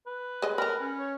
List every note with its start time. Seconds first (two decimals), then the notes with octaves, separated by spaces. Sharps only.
0.07 B4
0.42 G#3 D#5
0.58 A#4 A#5 B5
0.81 C#4
0.99 C#5